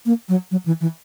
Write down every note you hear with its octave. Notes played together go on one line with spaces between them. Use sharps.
A#3
F#3
F#3
E3
E3